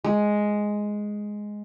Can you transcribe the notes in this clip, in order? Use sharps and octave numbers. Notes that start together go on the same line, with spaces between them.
G#3